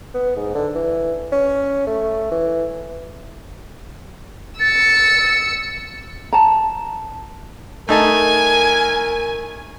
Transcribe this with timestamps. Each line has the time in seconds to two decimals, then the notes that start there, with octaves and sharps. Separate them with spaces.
0.14 B3
0.36 G#2
0.55 D3
0.75 E3
1.32 C#4
1.87 A3
2.31 E3
4.60 E6 A6 C#7
6.33 A5 A#5
7.89 A3 D#4 A#4 G#5 A5